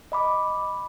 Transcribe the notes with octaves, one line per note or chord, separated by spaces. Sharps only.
D#5 B5 D6